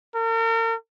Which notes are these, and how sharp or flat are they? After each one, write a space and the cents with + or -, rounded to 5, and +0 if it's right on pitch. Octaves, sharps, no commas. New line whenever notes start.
A#4 -40